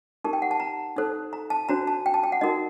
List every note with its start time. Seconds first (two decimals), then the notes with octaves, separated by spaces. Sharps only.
0.24 D#4 G4 A#4 A5
0.33 G5
0.42 F#5
0.51 A5
0.60 A#5
0.97 D#4 A4 C5
1.33 A#5
1.50 A5
1.69 D4 F#4 C5 A#5
1.87 A5
2.06 G5
2.14 A5
2.23 G5
2.32 F#5
2.41 D#4 F#4 A#4 D#5